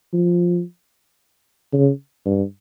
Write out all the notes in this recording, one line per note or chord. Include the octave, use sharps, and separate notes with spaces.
F3
C#3
G2